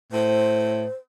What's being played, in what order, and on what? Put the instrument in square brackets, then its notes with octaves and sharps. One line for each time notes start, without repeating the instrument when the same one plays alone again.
[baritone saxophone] A2 [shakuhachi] C5